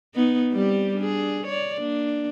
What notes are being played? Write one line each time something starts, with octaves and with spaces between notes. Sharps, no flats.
B3 D#4
G3 C4 G4
D4 G#4
C#5 D5
A#3 D4